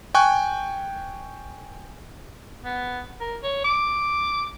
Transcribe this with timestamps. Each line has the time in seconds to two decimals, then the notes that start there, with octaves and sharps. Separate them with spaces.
0.15 G5 G#5 C#6 F#6
2.65 B3
3.20 A#4
3.43 C#5
3.64 D6